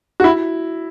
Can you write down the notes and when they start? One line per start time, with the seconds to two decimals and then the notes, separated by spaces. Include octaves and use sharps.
0.20 F#4
0.24 E4